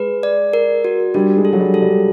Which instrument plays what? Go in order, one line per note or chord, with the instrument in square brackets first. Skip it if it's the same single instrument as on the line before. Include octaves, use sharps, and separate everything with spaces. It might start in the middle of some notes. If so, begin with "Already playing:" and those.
Already playing: [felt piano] G#3 [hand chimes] B4
[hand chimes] D5
A#4
F#4
[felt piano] G3 [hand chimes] D4
[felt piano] G#3
[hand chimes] A4
[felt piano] F#3
G3
[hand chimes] A4
[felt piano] G3